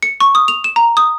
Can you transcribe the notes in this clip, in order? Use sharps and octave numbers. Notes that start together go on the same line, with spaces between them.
C#7
C#6
D#6
F7
E7
A#5
D#6